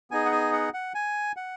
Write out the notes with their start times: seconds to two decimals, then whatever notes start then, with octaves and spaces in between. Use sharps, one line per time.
0.11 B3 D#4 G#4 G#5
0.26 F#5
0.32 G#5
0.53 F#5
0.74 F#5
0.95 G#5
1.37 F#5